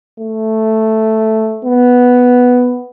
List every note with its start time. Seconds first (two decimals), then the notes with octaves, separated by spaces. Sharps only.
0.20 A3
1.65 B3